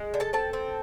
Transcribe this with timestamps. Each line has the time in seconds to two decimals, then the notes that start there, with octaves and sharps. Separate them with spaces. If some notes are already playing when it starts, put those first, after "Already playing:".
Already playing: G#3
0.14 D3
0.20 A4 A5
0.33 C4 A4 A5
0.53 C4